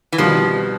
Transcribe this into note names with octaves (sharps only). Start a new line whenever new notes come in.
E3
C2 B2 D#3 F3 G3